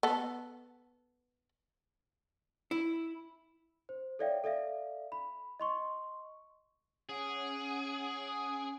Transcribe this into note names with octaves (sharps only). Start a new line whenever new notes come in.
B3 A4
E4
C5
A4 C#5 D5 E5 F5 G5
A4 D5 E5 F5
B5
D#5 C6 C#6
C#4 G#4 F#5 D7